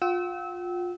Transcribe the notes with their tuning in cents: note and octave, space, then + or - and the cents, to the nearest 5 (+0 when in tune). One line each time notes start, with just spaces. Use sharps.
F4 +25 G5 -45 E6 -25